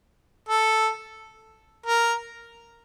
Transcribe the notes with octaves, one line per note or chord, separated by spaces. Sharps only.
A4
A#4